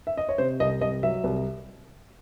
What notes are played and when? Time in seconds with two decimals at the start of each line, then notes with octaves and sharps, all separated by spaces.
0.07 E5
0.17 D#5
0.29 C#5
0.38 C3 C5
0.60 C2 D#5
0.81 C2 D#5
1.03 F#3 E5
1.24 C2